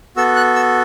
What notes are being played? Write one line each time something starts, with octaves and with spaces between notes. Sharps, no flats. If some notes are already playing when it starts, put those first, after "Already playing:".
B3 F#4 A4 E6
F#6
E6